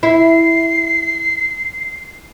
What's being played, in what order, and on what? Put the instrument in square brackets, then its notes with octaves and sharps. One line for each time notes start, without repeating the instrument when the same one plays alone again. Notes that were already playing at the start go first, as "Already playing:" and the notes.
[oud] E4 [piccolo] C7